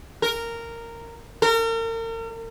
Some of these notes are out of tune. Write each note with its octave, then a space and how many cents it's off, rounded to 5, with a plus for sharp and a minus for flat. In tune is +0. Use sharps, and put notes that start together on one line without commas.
A#4 -10
A#4 -40